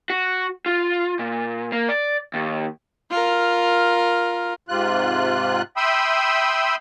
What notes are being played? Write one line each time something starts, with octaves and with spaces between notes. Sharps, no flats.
F#4
F4
A#2
A#3
D5
D#2
F4 A#4
G#2 C3 F4 F#6
E5 G5 B5 C6 D#6 E6